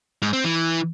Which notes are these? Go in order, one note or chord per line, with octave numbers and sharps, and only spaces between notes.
G#2
C4
E3